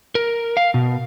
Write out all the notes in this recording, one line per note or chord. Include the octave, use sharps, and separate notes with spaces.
A#4
F5
B2